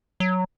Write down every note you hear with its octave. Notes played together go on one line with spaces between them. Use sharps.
F#3